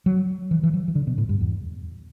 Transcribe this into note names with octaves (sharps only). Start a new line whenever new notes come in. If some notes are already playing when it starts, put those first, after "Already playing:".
F#3
E3
E3
F#3
E3
D3
B2
A2
G2
E2